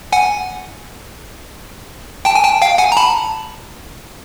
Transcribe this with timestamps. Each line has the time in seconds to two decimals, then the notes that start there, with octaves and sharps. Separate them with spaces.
0.12 F#5 G#5
2.25 G5 A5
2.35 G#5
2.44 G5 A5
2.61 F5 G5
2.78 F#5 G#5
2.92 A#5
2.97 A5 B5